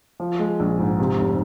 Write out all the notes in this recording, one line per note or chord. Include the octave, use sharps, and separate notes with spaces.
F3
G#3
A#1
G#2
C3
F1